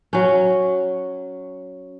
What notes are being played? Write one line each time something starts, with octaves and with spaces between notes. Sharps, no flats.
F#3 C#4